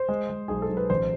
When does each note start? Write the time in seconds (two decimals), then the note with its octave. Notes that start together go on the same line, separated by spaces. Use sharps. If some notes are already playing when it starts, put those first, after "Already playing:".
Already playing: C5
0.09 G#3
0.30 G#3
0.48 B1 G#4
0.62 A4
0.69 B1
0.77 B4
0.90 A1 C5